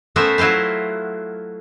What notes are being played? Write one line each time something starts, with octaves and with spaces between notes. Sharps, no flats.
A3 B3 C#4 A#4 C5 E5
F#3 E4 F4 C5 F5